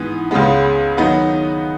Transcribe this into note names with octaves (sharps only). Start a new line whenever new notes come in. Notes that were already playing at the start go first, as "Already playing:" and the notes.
Already playing: G#2 E3 B3
C#2 C#3 G#3 B3
D#3 F#3 B3 D#4 F#4